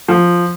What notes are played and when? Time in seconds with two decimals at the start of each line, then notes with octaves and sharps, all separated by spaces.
0.08 F3